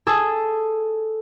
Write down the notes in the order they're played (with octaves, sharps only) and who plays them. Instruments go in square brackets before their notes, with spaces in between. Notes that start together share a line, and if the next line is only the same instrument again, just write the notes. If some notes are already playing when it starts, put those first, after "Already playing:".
[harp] G#4 A4